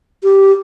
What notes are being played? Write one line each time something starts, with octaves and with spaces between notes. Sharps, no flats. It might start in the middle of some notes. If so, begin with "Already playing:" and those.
G4